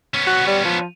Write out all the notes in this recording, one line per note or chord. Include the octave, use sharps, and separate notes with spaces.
B3 C#4
F#4
G3
F3